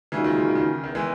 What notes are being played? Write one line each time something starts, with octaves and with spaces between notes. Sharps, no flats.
A#2 C#3 E3 G#3 D#4 F#4
D#3
C#3
D#3
C#3
D#3
E2 D#3
E3 G#3